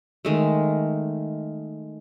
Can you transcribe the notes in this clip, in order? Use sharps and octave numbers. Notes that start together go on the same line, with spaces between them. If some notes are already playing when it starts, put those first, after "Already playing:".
D#3 G#3 A3